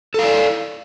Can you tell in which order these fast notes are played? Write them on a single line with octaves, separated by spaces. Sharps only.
A4 F5 D5